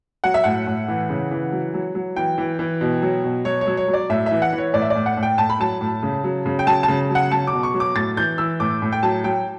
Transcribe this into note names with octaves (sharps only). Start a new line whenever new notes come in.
F#3 F#5
E5
A2 F#5
A2
E3
C#3
E3
F#3
F#3
F#3
E3 G5
E3
E3
B2
F#3
B2
F#3 C#5
C#5
F#3
C#5
F#3
D5
A2 E5
E5
E3
F#5
E3
C#5
A2 D5
E5
A2 D5
F#5
A2
G5
A2 A5
B5
F#3 A5
A2
C#3
F#3
C#3
G5
F#3 A5
A5
C#3
F#3
F#5
F#3 A5
D6
B2
C#6
F#3
D6
A2 A6
E3 G6
E3 E6
A2 D6
A2
G5
F#3 A5
F#3 G5